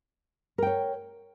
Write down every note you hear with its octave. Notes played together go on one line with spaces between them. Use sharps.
A#4 C#5 G5